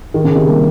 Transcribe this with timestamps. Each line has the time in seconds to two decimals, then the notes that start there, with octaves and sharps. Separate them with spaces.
0.14 D#3
0.24 C#3
0.35 C3 D#3
0.47 G3 A#3